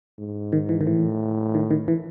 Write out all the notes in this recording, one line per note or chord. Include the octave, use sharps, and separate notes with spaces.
G#2
D#3
E3
D#3
A2 E3
D#3
D#3
E3